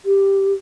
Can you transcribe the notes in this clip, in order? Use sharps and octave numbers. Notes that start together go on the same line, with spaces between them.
G4